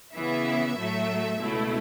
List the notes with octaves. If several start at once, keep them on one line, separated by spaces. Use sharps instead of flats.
C#3 E3 B3 E4 E5
A2 F#3 A3
C#2 B2 A3 E4